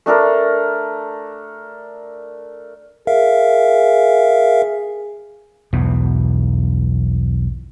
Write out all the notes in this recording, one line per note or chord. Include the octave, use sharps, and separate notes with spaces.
A3 D4 A4 A#4
G#4 A#4 E5 F5
B1 E2 G2 B2